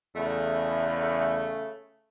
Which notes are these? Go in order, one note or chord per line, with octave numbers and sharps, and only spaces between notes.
E2 C#3 A3